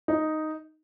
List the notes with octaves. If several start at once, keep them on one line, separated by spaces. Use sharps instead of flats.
D#4